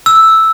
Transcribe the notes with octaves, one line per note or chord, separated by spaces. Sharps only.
E6